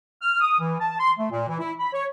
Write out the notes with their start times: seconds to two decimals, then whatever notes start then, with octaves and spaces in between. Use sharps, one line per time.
0.22 F6
0.41 D#6
0.60 E3
0.80 A5
0.99 C6
1.19 A3
1.30 A#2
1.47 E3
1.59 E4
1.79 B5
1.92 C#5